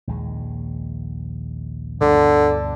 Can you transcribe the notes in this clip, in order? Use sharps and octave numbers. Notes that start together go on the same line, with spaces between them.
A#1 D#2 G#3
D2 G2 B2 D3